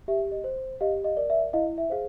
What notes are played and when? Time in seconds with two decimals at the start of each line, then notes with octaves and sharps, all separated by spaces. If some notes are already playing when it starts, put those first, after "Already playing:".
0.08 G4 E5
0.32 D#5
0.44 C5
0.81 G4 D#5 F5
1.04 D#5 F5
1.17 A#4 D5
1.30 E5
1.53 E4 D#5 F5
1.78 E5
1.90 G#4 C5 F5